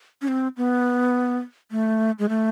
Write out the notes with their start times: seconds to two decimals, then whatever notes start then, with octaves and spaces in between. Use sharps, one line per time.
0.22 C#4
0.28 C4
0.57 B3
1.71 A3
2.19 G#3
2.29 A3